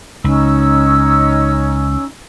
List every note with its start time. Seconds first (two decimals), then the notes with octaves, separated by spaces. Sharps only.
0.24 C#2 C#4 D#4 E6